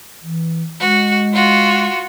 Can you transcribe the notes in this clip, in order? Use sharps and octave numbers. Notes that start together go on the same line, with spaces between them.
E3
G#3 F#4
F4 F#4